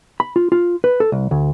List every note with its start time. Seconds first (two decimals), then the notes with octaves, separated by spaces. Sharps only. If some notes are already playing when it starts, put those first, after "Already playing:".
0.20 B5
0.36 F4
0.52 F4
0.84 B4
1.00 A4
1.12 C2
1.31 D2